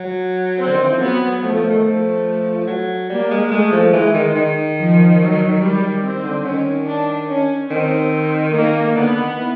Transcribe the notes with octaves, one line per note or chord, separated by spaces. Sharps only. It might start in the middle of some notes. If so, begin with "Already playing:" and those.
Already playing: F#3
C4
D3
D#3
E3
F3
F#3 B3
F3 A3
F3
D#3
F3 A3
F3
F#3
G3 A#3
G#3
G#3 A3
F3
E3 G#3
D#3
D#3
F3
F#3
D#3 G3
D#3
D#3 C4
D3
D#3 C#4
D4
C#4
D#3 C4
D#3 A#3
D3 B3
D#3
E3